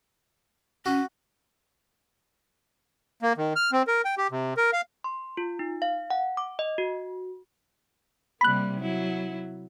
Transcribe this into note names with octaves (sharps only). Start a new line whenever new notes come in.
C#4 F#4
A#3
D#3
F6
C4
A#4
G5
G4
C3
A#4
F5
C6
F4
D#4
F5
F#5
D6
D#5
F#4
C3 G3 A#3 B5 F#6
F#3 E4